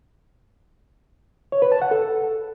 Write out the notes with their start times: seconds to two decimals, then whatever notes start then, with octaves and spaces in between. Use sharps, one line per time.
1.52 C#5
1.62 B4
1.72 A5
1.82 F#5
1.91 A4